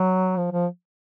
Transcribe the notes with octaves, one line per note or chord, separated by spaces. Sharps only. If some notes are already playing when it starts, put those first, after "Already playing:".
Already playing: F#3
F3
F3